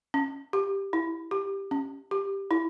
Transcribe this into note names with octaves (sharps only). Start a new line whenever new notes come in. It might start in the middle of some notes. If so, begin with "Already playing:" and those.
C#4
G4
E4
G4
C#4
G4
E4